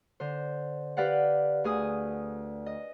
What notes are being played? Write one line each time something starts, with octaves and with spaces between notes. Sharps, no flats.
D3 C5
G4 B4 D5 F5 F#5
D2 G#4 D#6
D#5